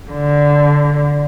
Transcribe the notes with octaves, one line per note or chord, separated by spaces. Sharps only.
D3